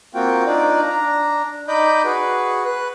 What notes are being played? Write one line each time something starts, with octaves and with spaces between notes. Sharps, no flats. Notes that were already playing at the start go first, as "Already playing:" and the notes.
A#3 C4 F4 F#4 G5
D4 D#4 F4 D5
D4 A#5
D#4 D5 D#5 B5 D6 G6
F#4 G#4 B4
B4 F#6